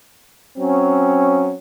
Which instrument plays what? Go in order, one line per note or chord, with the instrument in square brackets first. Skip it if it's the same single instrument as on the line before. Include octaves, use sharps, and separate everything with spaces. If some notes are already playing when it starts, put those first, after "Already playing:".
[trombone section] F#3 C4 C#4